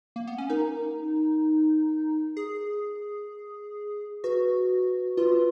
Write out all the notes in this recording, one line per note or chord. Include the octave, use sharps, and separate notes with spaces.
A#3
B3
C#4
D#4 A#4
G#4
F#4 B4
F4 B4